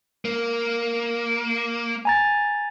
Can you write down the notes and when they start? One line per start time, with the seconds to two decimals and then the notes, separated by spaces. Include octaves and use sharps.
0.25 A#3
2.05 G#5 A#5 A6